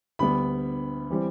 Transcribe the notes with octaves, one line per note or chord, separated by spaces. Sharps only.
D2 D3 G3 B3 B5
E3 G3 C4